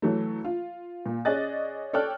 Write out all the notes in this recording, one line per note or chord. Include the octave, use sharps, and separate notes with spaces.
E3 F#3 A3
F4
A#2
C#4 G#4 D5 D#5 F#6 A6
A4 C#5 D5 G5 F6 F#6